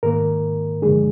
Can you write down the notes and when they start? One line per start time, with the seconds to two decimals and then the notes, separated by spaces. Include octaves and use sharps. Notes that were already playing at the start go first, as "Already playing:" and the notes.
0.03 G#2 D#3 A#3 A#4
0.82 G2 D3 F3 G#3 D4 G#4